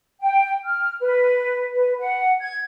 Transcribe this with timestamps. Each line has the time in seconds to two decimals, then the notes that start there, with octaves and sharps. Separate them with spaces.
0.21 G5
0.66 F6
1.00 B4
1.74 B4
1.98 F#5
2.40 G#6